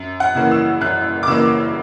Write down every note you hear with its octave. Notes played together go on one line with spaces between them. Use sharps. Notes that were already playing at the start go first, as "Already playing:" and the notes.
Already playing: F#2
F#5
C#3 E3 A#3
E6
F#2 F#6
D6
C#3 E3 A#3 E6